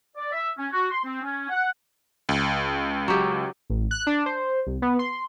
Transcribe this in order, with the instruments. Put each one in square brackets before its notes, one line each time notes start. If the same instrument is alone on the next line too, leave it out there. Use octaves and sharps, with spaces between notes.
[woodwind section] D5
E5
C#4
F#4
C6
C4
C#4
F#5
[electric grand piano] C#2
[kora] F#3 G4
[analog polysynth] A1
F#6
D4
C5
C2
B3
C6